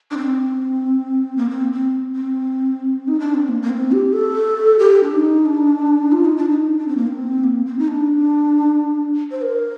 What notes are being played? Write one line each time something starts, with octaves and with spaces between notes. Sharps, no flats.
D4
C4
A#3
C4
C4
C4
D#4
D4
C4
A#3
A#3
C4
G4
A4
G4
D4
D#4
D4
F4
D#4
D4
D#4
D4
C4
A#3
C4
A#3
C4
D#4
D4
C5
A#4